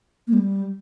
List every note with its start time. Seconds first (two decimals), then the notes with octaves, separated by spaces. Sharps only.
0.27 A#3
0.33 G3